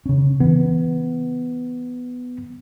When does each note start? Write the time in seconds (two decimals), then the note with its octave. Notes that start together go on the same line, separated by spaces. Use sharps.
0.06 C#3 C#4
0.40 E3 B3